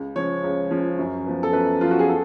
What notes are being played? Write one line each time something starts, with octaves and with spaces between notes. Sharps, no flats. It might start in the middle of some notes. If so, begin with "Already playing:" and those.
Already playing: C#2
C#3 F3 C#5
C#2
C#3 F3
F#2
F3 B3
A4
F#2 B4
F3 B3 F4
F#4
G#4
A4